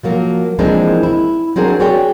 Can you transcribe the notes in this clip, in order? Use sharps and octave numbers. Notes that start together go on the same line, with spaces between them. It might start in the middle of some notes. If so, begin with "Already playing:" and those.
F3 F#3 A#3 F#4
E3 F3 G#3 A#3 C4 D4
E4
F#3 C4 D4 F#4 G#4 A#4
F#4 G#4 C#5 D5 G5